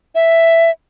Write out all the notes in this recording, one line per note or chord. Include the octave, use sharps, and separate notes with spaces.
E5